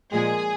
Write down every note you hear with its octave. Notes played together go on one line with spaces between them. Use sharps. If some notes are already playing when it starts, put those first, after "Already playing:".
A#2 F3 G#3 G#4